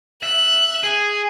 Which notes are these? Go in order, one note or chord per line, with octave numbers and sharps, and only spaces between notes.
E5 F#6
G#4